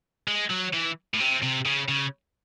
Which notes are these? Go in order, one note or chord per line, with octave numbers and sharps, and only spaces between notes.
G#3
F#3
E3
A2
C3
C3
C#3
C#3